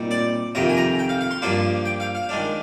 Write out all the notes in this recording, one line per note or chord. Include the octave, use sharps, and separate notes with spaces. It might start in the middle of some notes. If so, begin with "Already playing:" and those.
Already playing: A#2 G3 C4 D#4
D5
F2 C3 D#3 A#5
G#5
A#5
G5
F5
F5
C6
G2 F3 A#3 D4 C6
G5
F5
F5
D#3 G#3 D4